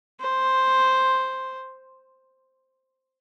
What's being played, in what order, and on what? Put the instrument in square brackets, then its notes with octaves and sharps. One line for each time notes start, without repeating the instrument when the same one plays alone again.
[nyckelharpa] C5